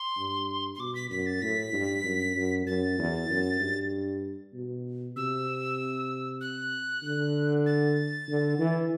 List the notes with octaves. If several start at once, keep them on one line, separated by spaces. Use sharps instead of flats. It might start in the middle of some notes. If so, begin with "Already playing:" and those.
Already playing: C6
G2
C6
B2 D6
B6
F#2 B6
A6
A2 B6
G2
F#2
F#2
F#2 A6
E2
F#2
G2
B2
C3 E6
F#6
D3
A6
D3
E3